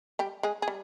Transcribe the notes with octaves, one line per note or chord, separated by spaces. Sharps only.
G3 G4
G#3 G#4
G#4
G3